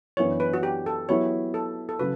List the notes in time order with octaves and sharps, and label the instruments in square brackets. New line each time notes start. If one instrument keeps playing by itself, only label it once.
[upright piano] F#2 E3 B3 D4 [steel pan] C#5
[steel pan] B4
F#4
G4
A4
[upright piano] F#3 B3 E4 G4 [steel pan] C#5
[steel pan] A4
A4
[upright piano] C#3 F#3 [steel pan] B4